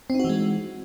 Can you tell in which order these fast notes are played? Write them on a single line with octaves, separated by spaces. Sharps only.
C4 D#4 F#4 E3 G#3